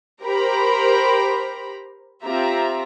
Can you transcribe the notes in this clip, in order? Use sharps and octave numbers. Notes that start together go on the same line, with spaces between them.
G4 A#4 C5 A#5 B5
C4 F4 G4 E5 A#5